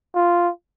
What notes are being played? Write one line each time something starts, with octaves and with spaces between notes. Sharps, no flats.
F4